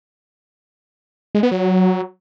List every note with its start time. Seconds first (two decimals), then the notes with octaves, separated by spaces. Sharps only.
1.35 G#3
1.43 B3
1.51 F#3